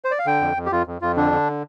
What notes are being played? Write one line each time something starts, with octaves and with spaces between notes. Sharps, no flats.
C5
D5
F5
D3 G5
F2
F2
G4
F2 F4
F2
F2 F4
D3 D4
D3